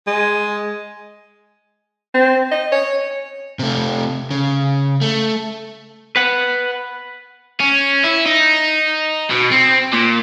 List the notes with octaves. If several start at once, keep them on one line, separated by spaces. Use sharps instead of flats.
G#3
C4
D#5
C#5
C3 A3
C#3
A3
B4 F#5
C#4
E4
D#4
B2
C4
A#2